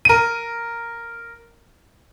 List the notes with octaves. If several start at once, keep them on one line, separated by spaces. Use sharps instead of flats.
A#4 D#7